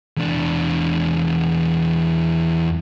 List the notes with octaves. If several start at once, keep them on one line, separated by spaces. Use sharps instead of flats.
E2 D4